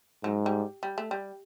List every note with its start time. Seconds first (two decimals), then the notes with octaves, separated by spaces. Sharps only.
0.24 G#2 F#3
0.46 G3
0.83 G3
0.98 A3
1.11 G3